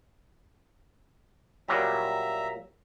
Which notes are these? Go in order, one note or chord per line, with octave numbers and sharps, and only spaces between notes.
A#2 F#3 G3 E5 A#5